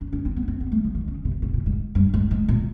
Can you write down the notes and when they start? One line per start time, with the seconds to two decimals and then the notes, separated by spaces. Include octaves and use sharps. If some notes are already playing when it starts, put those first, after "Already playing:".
0.01 D4
0.13 D4
0.25 C4
0.36 B3
0.48 C4
0.60 B3
0.72 A3
0.84 F3
0.95 D#3
1.08 C#3
1.25 C3
1.42 B2
1.54 A#2
1.66 G#2
1.95 G2
2.14 G#2
2.31 G#2
2.48 A#2